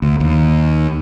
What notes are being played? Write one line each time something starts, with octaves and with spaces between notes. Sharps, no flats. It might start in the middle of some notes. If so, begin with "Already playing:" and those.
D2
D#2